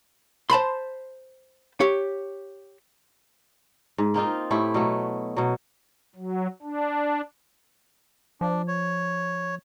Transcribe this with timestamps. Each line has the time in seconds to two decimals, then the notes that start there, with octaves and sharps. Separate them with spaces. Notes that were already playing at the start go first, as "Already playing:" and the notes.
0.50 C5 A5 B5 C6
1.80 G4 C#5
3.98 G#2
4.14 A#3 C4 D#4 F4
4.51 A2 A3 E4 G4
4.74 B2 F#3 A3
5.37 B2 F#3
6.15 F#3
6.62 D4
8.41 F3 D4
8.68 C#5